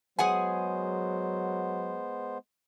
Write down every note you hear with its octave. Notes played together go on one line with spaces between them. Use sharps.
F#3 G#3 B3 G#4 C5 F#5 G#5